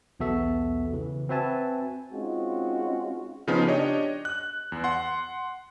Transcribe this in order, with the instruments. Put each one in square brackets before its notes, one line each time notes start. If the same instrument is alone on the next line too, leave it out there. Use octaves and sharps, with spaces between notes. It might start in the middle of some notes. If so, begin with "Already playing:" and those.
[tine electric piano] B1 E2 B3 F#4 A4 E5
C#3 E3
C4 F#4 B4 E5 G#5 A5
[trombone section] G#3 C4 C#4 D#4 F4 F#4
[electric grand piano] C#3 F3 B3 C#4 D#4
D4 G4 C#5 D#5
F#6
E2
F#5 C6